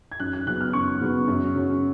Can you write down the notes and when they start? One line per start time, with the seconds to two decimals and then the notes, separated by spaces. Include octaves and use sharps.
0.12 G#6
0.20 F#2 F#6
0.33 F#6
0.46 C#3 F#3 B3 F#6
0.61 F6
0.73 F#2 C#6
1.01 C#3 F#3 B3
1.28 F#2
1.55 C#3 F#3 C#4